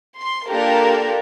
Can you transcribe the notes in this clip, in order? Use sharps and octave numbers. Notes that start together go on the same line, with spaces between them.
C6
A#3 D4 F4 G4 A4 A#4